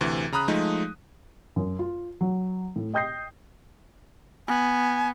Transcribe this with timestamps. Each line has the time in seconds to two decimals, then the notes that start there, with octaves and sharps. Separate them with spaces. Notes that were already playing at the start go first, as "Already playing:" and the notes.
0.01 D2 C3 E3
0.32 C#3 A#5 B5 D#6 F#6
0.48 F3 G#3 A3 D#4
1.56 F#2
1.79 F4
2.21 F#3
2.76 A2
2.94 D#5 G5 D#6 G6 A#6 C7
4.48 B3 G#5